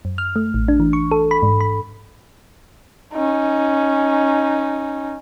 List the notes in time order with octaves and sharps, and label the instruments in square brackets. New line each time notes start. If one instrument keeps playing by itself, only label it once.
[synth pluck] F#2
F6
A3
A1
D4
E3
C#6
A4
B5
G#2
B5
[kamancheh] C#4 D#4